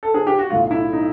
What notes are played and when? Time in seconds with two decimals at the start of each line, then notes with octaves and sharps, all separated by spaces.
0.03 A4
0.14 G#4
0.27 G4
0.39 F#4
0.49 B1 A2 F#3 F4
0.71 E4
0.92 D#4